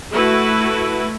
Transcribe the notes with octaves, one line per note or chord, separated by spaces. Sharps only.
A3 E4 F#4 B4